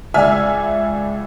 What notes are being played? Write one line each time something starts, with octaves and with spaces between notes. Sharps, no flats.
C#2 D5 E5 G#5 E6 F6